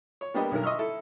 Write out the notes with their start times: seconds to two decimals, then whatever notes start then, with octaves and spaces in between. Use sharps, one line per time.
0.21 C#5
0.34 G3 A#3 B3 D4 G4 D#5
0.51 B1 G2 D#3 A#4
0.63 D#5 E5 C6 C#6 E6 F6
0.79 E4 A4